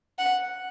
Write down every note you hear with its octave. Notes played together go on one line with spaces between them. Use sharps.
F#5